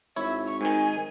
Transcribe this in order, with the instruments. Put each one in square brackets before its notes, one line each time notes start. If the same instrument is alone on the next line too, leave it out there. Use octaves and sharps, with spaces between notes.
[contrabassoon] G#1 [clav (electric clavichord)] E4 C#5 [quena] E5
[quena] C#6
[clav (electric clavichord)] G#2 D#3 [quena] G#5